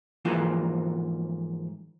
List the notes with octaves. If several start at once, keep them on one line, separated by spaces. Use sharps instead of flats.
G#2 E3 F3 A#3 F#4